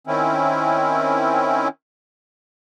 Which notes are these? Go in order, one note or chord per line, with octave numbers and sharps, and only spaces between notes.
D#3 C4 C#4 E4